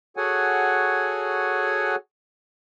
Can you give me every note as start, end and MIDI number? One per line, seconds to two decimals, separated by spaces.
0.17 1.95 66
0.17 1.95 68
0.17 1.95 69
0.17 1.95 73
0.17 1.95 78
0.17 1.95 80